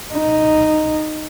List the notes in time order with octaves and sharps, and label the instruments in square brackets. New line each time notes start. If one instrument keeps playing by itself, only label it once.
[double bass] D#4